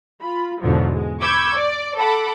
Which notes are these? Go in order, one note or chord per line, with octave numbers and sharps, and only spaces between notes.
F4 B5
E2 G#2 B2 D3 F3 F#3
G#3
B5 C#6 D6 E6 G6 G#6
D5
A4 F#5 B5 D6